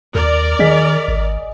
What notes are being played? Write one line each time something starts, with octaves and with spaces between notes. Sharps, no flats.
D#2 A#4 D5
D#3 G#4 D#5 B6
G#1